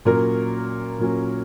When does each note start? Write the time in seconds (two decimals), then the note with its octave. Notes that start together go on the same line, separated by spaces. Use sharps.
0.05 A#2 F#3 C#4 A#4
0.99 A#2 F#3 C#4